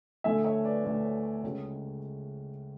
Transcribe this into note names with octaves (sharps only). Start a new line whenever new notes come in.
D2 D3 A3 E5 G#5
C#5 E5
B4 D5
D2 D3 A3
C#5
C#5
C#2 C#3 G#3 C#5